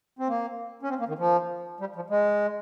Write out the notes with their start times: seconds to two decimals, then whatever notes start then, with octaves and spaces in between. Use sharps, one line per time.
0.19 C4
0.28 A#3
0.83 C#4
0.89 C4
0.99 A#3
1.08 D#3
1.19 F3
1.80 G3
1.96 F3
2.10 G#3